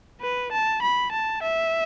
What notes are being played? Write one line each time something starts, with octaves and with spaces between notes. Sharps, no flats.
B4
A5
B5
A5
E5